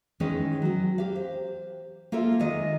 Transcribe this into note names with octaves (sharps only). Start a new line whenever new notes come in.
D#3 E3 G#3 B3 C#4 D#4
F#3 F#4
G4 F5
C5
A#3 F4 A4 A#4 E5
D#3 G#3 D#5